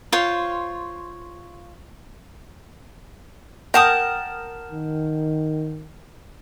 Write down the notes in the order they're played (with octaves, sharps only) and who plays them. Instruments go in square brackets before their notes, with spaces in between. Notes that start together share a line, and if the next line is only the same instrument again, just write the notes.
[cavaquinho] F4 C5 C#5
[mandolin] A#4 A5 D#6 [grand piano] F#5 G5 G6
[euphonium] D#3